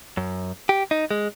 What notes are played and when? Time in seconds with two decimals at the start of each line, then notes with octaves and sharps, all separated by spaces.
0.17 F#2
0.69 G4
0.91 D#4
1.11 G#3